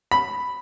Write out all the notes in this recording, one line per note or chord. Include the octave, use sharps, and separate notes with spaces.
B5